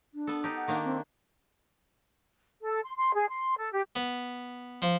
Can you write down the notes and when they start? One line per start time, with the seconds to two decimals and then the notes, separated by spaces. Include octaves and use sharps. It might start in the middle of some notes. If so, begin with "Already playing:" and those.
0.14 D4
0.27 B3 A4
0.44 D#4 G4
0.56 F#5
0.68 D#3 A#3 D4
0.85 C4
2.63 A4
2.85 C6
2.96 C6
3.14 G#4
3.30 C6
3.58 A4
3.73 G4
3.96 B3
4.82 F3